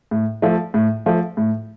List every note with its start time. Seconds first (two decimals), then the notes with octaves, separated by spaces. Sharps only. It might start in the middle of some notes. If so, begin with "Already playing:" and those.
0.11 A2
0.42 F3 A3
0.74 A2
1.06 F3 A3
1.37 A2